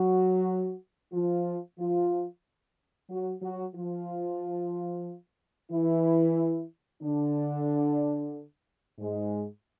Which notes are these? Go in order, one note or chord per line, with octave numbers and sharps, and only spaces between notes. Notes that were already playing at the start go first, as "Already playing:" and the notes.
Already playing: F#3 F#4
F3 F4
F3 F4
F#3 F#4
F#3 F#4
F3 F4
E3 E4
D3 D4
G#2 G#3